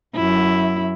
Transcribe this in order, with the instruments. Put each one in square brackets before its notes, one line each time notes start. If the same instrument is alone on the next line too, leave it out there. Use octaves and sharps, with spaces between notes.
[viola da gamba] F#2 E4